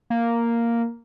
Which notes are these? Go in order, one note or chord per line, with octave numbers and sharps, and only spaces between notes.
A#3